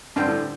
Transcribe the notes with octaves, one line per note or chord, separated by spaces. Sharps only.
G2 D3 G3 C4
A2